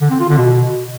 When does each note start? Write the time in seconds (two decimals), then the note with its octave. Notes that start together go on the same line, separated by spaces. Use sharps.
0.02 D3
0.11 C4
0.20 F4
0.29 D3
0.38 B2